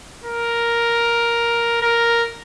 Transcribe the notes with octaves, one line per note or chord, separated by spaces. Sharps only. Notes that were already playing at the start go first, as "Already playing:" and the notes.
A#4
A#4